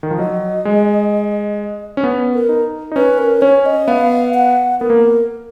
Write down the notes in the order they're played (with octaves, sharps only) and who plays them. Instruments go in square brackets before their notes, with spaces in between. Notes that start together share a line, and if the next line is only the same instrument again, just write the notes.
[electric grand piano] D#3
F3
[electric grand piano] F#3 [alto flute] D#5
[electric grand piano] G#3
C#4
B3
[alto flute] A#4
[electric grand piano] D#4
D#4
[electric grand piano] C#4 [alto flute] B4
[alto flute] A#4
[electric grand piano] C#4 [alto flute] C#5
[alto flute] D#5
[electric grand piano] B3 [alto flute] F5
[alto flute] F#5
[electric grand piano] B3 [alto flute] A#4
[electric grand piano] A#3